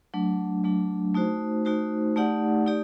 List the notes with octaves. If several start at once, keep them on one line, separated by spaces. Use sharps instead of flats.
F#3 A3 D4
F#3 A3 D4
A3 D#4 F#4 C5
A3 D#4 F#4 C5
A3 D#4 G4 D5 F#5
A3 D#4 G4 D5